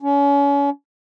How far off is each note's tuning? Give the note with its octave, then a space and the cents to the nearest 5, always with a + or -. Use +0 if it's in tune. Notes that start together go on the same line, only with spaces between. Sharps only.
C#4 +35